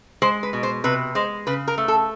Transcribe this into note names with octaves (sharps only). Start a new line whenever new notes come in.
G#3 C5
B4
B2
C5
C3 B4
G#3 C5
C#3 B4
A#4
A3
A4